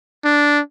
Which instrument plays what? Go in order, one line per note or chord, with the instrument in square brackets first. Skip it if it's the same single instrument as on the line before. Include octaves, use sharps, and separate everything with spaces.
[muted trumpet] D4